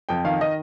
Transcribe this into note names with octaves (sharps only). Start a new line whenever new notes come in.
F2 G5
D#3 F5
D#3 D#5